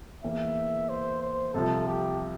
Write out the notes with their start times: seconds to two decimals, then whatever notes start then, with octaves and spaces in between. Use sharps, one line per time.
0.23 E2 E3 A#3 E5
0.89 C5
1.22 C5
1.54 C2 C3 F3 A4
1.87 G4